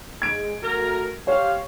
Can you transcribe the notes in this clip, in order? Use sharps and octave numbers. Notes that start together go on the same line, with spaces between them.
G#3 G#6 D7
A3 F#4 A#4
G4 C5 C#5 F5